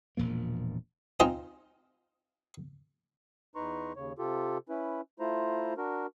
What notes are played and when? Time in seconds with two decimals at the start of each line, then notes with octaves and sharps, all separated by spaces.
0.17 E1 A#2 F3 A#3
1.20 C4 D#4 F4 C5 D#5 G#5
3.55 E2 D#4 B4 A#5 C6 C#6
3.96 D#2 C#3 C#5
4.19 C3 F4 G4 A4
4.69 C#4 E4 B4
5.20 A3 E4 F4 C5 A#5
5.77 D4 F#4 A#4